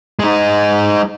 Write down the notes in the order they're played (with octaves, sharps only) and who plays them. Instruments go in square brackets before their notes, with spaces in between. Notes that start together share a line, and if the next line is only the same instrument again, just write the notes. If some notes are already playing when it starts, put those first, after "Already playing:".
[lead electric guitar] G#3 D#4